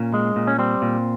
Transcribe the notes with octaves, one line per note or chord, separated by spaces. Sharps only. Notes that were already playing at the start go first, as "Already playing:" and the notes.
Already playing: A#2 C#4
G#3
A#2
C#4
G3 C4
A#2